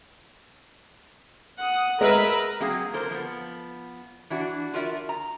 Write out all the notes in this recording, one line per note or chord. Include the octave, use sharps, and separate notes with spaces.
F#5 D#6
G#3 A#4 B4 E5 A#5
F#3 A#3 C4 G#4 F5
A#3 A4 A#4 C5
F3 B3
E3 D4 F#4
F4 F#4 A#4 D5 E5
A#5